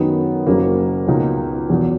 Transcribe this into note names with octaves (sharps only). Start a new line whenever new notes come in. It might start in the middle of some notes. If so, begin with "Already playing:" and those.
Already playing: F#2 D#3 F#3 B3 D#4
F#1 F#2 C#3 F#3 A#3
C#2 B2 A#3 D#4
E2 B2 F#3